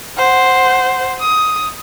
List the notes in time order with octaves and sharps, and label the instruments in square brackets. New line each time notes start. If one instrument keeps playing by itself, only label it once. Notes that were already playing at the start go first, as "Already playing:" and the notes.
[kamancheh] C5 F#5
D#6